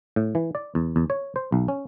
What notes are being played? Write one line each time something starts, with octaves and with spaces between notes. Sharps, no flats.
A2
E3
D5
E2
E2
C#5
C5
B1
C#4